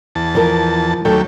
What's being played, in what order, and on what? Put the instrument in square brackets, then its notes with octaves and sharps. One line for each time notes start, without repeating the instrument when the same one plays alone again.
[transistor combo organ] E2 A5
[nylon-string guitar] F3 A#4
[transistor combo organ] D#2 A3 G5 [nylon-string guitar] F#3 A4